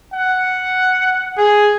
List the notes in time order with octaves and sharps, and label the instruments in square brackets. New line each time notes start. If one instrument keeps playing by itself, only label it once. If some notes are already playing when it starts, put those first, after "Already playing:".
[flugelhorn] F#5
G#4